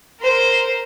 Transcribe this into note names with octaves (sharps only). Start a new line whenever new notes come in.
A#4 C5